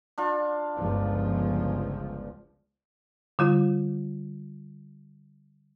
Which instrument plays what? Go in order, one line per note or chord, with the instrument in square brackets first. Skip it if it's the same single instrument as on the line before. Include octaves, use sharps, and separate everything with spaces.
[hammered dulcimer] D4 F4
[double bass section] G1 C#2 F3
[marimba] D3 G3 F4